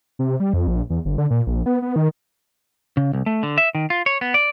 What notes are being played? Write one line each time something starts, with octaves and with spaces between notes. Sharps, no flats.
C3
G3
F2
A#1
E2
G1
D3
A#2
A#1
B3
B3
D#3
C#3
C2
A3
D3
E5
D#3
F4
C#5
B3
D5